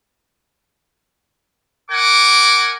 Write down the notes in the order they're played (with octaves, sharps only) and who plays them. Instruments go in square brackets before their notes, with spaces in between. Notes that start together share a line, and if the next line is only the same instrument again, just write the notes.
[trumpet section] A#4 F#5 G#5 D6